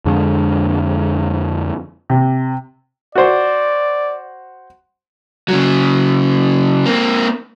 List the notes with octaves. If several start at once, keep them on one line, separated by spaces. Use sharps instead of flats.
F2 D3 G#3
C3
F#4 C5 D5
C#3 F#3
A#3 C4